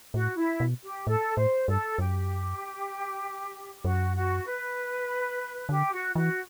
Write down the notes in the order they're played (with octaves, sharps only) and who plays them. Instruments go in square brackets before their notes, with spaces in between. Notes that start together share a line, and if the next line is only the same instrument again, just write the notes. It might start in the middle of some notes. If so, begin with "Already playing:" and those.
[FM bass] A2 [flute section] F#4
[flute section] E4
[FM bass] B2
[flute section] G4
[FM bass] A2 [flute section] A4
[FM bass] A2 [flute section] C5
[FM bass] G2 [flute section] A4
[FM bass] F#2 [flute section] G4
[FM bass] F#2 [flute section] F#4
[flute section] F#4
B4
[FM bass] D3 [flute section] G4
[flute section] F#4
[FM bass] E3 [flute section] F#4